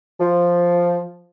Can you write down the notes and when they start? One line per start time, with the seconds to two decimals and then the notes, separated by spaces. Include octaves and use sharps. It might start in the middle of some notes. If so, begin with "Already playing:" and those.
0.20 F3